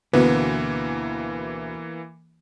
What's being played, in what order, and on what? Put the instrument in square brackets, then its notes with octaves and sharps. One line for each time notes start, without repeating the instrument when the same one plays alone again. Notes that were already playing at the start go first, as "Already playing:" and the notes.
[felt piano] D2 B2 [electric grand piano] E3 A#3 [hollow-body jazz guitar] B3